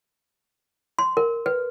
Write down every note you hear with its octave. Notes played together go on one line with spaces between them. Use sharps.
C6
A#4
B4